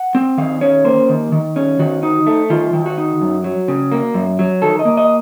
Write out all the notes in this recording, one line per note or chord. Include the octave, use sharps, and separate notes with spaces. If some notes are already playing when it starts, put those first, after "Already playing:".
Already playing: F#5
C4
D#3 F5
C#4 C#5
A#3 C5
D#3
D#3
C#4
D#3 F#4
D#4
A3
D#3 F4
D#3
F#4
D#4
F#2
F#3
C#3
A#3
F#2
F#3
D#3 A4
D#5
A#3
D#5